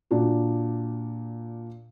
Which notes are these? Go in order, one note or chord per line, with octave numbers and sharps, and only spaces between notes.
A#2 D4 F#4